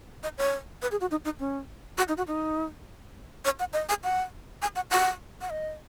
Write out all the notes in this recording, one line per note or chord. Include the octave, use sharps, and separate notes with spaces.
D#5
C#5
B4
G#4
F#4
D#4
D#4
C#4
F#4
D#4
F#4
D#4
C#5
F#5
D#5
G#5
F#5
G#5
F#5
F#5
F#5
D#5